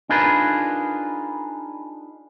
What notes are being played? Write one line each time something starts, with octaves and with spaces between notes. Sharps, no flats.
D4 D#4 F4 G#4 A#4 B4